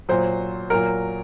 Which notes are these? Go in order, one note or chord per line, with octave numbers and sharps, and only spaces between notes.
A#2 F#3 C5
A#2 F#3 A#4